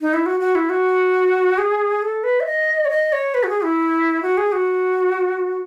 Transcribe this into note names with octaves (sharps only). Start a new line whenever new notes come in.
D#4
E4
F#4
F#4
E4
F#4
G#4
A4
B4
E5
D#5
C#5
D#5
C#5
B4
F#4
G#4
E4
F#4
G#4
F#4